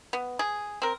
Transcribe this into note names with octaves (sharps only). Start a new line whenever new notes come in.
B3
G#4
C4 A#4